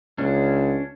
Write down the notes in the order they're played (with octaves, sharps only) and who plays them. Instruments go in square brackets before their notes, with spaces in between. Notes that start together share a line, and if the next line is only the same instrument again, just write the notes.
[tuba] C#2 [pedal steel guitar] C#4 D4